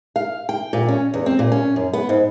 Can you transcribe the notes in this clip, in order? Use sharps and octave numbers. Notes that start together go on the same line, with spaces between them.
F5
G5
A#2
C#4
E2
C4
A#2
C#4
F#2
B3
G#2